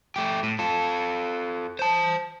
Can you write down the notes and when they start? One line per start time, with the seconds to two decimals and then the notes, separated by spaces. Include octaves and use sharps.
0.16 A3 G4
0.43 A2
0.59 F4 A4
1.79 C5 A5